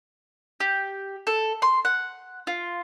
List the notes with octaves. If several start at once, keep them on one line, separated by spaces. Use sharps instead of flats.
G4
A4
C6
F#5
F4